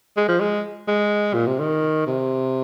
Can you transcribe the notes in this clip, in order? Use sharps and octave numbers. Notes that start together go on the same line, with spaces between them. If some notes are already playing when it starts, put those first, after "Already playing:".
G#3
F3
G#3
G#3
A#2
C3
D#3
C3